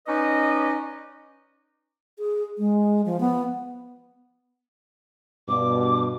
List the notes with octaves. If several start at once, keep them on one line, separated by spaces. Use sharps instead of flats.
C#4 D#4 B4 D5 D#5
G#4
G#3
F3
B3
G2 B2 D6